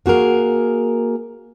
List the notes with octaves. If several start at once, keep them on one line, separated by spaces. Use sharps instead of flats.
A#3 F#4 G#4 A#4